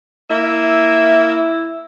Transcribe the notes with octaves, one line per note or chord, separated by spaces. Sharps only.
A#3 E4 E5